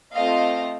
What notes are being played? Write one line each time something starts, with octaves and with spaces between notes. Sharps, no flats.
A3 C4 F4 D#5 F5